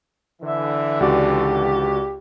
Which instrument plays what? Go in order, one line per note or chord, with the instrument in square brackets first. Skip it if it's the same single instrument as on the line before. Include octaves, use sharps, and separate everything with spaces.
[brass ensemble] D3 E3 [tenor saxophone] E5
[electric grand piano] C#2 F#4 D5 [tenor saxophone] G4